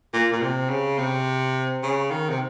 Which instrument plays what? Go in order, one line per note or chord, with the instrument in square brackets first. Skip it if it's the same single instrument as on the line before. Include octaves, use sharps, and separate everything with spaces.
[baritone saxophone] A#2
A#2
C3
C#3
C3
C#3
D#3
C3